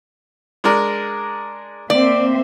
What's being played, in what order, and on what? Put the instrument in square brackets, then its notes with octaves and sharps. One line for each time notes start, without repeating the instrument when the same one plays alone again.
[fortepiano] G#3 D4 A#4
[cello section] A#3 C4 E5 [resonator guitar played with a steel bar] D5